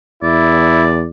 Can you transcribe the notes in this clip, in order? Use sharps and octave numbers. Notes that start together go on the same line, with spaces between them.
E2 E4 D5